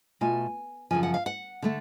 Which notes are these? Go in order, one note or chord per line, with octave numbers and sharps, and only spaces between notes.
B2 A3 F4 G#5
F#2 C#3 F3 G#5
F#5
F5
F#5
D3 F3 A3